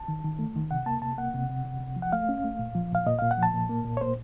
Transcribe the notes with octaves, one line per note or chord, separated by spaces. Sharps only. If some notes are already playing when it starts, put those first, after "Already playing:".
Already playing: A5
D#3
D#3
A3
D#3
C3 F#5
A#3 A5
C3 A5
A#3 F#5
C3
C3
C3
C3
F3
F#5
A3 F5
C#4
A3
A#2
F3
A#2 F5
A#2 D#5
A#2 F5
F#5
F3 A5
A#2
A#3
A#2
C#5
A#3 C5